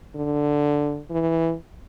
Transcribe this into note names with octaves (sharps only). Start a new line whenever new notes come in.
D3
E3